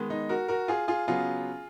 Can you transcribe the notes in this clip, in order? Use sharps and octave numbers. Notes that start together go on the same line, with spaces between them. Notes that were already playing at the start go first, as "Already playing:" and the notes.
Already playing: D#3 G#3 B3
D#4
F#4 A#4
F#4 A#4
F4 G#4
F4 G#4
C#3 F#3 B3 F4 G#4